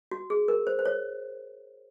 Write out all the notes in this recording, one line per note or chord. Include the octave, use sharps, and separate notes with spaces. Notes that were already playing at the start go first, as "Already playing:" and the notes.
F#4
G#4
A#4
C5
C5
C#5